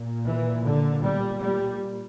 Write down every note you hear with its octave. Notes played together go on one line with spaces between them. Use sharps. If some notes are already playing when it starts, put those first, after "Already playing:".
Already playing: A#2
E3
D3
G3
G3